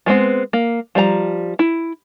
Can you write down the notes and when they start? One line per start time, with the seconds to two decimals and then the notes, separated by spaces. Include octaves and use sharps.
0.06 G3 G#3 B3 C4
0.53 A#3
0.95 F3 G3 A4 A#5
1.59 E4